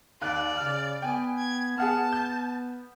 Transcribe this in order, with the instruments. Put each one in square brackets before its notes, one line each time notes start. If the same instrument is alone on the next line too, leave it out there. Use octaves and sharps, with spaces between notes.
[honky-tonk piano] D#2 F#6 [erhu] D5
[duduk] C#3 [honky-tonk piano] F6
[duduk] B3 [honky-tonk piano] G5 G#5
[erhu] G#6
[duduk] B3 [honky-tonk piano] G#4 F#5 F6 [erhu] A5
[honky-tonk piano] G6